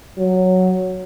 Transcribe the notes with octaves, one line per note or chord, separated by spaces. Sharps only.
F#3